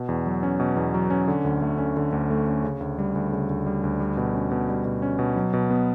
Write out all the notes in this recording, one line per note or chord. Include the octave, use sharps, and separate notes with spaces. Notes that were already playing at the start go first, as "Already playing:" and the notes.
Already playing: B2
E2
F#3
C#4
B2
E2
F#3
C#4
D3
D2
A3
C#4
D3
D2
A3
C#4
C#3
D2
G3
D2
C#3
D2
G3
D2
G3
B2
C#4
B2
G3
B2
C#4
B2
F#3
B2
B3